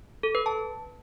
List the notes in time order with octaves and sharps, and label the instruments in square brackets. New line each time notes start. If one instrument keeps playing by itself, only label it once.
[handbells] A4
B4
A5